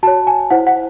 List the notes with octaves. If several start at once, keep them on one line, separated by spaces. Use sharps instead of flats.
F#4 C#5 A5
G#5
E4 C5 F#5
F#5